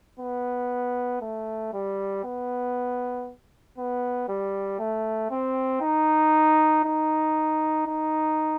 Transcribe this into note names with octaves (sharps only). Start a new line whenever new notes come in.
B3
A3
G3
B3
B3
G3
A3
C4
D#4
D#4
D#4